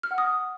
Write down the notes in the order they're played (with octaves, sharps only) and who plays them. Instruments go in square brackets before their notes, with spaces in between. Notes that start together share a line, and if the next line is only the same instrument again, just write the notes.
[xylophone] F6
F#5
D#6